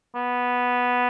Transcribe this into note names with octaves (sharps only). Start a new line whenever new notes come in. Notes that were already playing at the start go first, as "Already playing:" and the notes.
B3